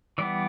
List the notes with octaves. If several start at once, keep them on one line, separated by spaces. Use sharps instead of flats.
E3 G3 B3 D5